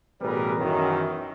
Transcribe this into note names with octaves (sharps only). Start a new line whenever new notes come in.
A1 B2 G3 G#4 A#4 B4
F#2 D#3 E3